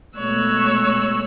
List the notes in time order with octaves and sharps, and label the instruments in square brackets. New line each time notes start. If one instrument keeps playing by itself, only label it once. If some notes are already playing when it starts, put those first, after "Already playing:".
[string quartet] B2 G#3 A3 C#5 E6 F#6